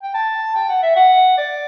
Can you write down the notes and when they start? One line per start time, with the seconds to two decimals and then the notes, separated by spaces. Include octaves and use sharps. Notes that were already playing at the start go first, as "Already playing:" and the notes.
0.03 G5
0.14 A5
0.55 G5
0.69 F#5
0.83 E5
0.96 F#5
1.38 D5